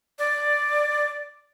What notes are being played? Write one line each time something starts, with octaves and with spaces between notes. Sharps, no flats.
D5